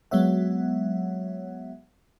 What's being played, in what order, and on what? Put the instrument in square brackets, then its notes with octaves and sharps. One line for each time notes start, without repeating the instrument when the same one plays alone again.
[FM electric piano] F#3 G#3 B3 C#5 E5 F#5